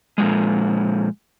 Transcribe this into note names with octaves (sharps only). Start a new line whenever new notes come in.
A#2 C#3 F3 G#3